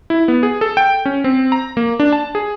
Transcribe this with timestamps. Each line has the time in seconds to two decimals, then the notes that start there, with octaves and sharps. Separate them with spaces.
0.10 E4
0.28 B3
0.43 G#4
0.61 A4
0.77 G5
1.05 C#4
1.24 C4
1.52 A#5
1.77 A#3
2.00 D4
2.12 A5
2.35 G#4